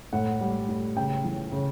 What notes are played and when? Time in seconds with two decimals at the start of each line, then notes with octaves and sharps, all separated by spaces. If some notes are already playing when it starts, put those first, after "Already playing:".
0.13 A2 F#5
0.41 G3
0.69 A2
0.97 C#3 G5
1.24 E3
1.52 C#3